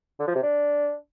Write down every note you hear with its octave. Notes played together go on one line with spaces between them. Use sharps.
D3
F3
C3
D4